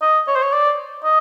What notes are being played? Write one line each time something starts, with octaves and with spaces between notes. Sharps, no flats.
D#5
C#5
C5
C#5
D5
D#5